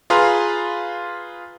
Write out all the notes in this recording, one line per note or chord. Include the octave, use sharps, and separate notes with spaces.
F4 G#4 B4 F5 A#5 C6